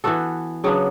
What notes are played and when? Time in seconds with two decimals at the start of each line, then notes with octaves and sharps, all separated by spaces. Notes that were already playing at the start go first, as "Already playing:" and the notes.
0.04 E3 B3 F#4 A4
0.64 C#3 F#3 B3 D4